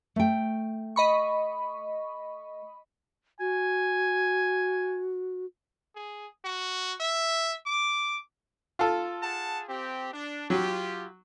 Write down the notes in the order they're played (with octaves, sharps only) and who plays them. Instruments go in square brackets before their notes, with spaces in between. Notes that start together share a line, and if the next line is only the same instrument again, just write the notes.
[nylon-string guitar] A3 G5
[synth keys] D#5 B5 C#6
[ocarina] F#4 [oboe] G#5
[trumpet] G#4
F#4
E5
D6
[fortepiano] F4 A4
[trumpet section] G#4 F#5 A5
C4 G4
D4
[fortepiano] F#3 [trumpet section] F4 G4